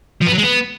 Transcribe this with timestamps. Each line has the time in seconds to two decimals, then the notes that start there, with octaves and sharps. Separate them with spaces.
0.22 F3
0.27 B3
0.33 F#3
0.38 G#3
0.44 B3